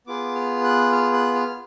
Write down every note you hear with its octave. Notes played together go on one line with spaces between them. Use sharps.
B3 F4 G#4 D6
F6
F#6
F6
F#6
F6